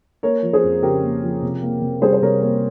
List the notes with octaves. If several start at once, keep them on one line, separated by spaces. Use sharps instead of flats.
A#3 A#4 C#5
F3
G#4 C5
F2
C#3 G4 A#4
A#3
F3
C3
A#3
C3
G3 G#4 C5
C5
C3 A#4 C#5
A#3 A#4 C#5